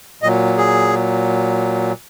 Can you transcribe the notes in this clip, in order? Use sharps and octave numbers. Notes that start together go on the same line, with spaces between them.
A#2 F#3 D#5
G#4